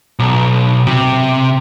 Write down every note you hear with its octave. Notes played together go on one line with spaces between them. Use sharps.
B1
C3